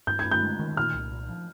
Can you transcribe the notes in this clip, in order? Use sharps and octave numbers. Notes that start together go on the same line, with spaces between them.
G2 G6
G#6
G2
G6
G#3
D#3
A#2 F6
C2
A#2
F3